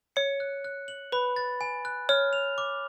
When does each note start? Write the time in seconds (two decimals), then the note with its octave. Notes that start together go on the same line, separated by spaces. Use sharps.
0.16 C#5 C#7
0.40 F#6
0.64 F#6
0.88 F#7
1.12 B4 B5
1.36 A6
1.61 G#5
1.85 F#6
2.09 C#5 F6
2.33 F7
2.58 D6